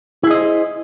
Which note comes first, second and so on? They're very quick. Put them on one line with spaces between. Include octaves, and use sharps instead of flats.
E4 G#4 D#5 C5